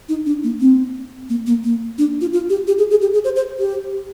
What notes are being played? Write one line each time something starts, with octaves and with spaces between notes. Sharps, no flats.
D#4
D4
A#3
C4
A#3
A#3
A#3
D4
F4
F4
G4
G4
G#4
G#4
G4
G#4
C5
C5
G4